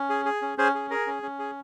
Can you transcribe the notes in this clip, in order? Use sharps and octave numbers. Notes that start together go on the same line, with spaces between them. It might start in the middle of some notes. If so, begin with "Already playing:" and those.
Already playing: C#4
G#4
G#4
C#4
C#4 G#4 C5
G#4
G#4 A#4
C#4
C#4
G#4